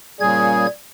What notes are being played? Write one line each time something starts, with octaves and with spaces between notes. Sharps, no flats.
A#2 C#3 G3 G#4 G#6